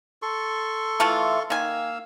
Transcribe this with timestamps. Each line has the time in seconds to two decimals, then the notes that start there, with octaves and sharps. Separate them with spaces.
0.22 A4 C6 C#6
1.00 E3 A3 F4
1.50 D#3 A#3 F5 G#5 E6